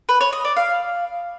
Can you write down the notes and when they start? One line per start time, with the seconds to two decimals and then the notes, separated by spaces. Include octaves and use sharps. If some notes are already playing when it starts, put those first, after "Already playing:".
0.09 B4
0.21 C#5
0.33 D#5
0.45 D5
0.57 F5